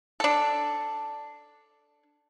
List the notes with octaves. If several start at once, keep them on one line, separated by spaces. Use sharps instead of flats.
D4 A4